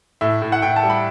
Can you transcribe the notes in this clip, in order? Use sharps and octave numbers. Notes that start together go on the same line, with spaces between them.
A2 E5
A2
F#5
A2 G5
A5
G3
B5